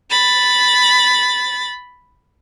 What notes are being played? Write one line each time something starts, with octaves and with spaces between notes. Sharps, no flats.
B5 A6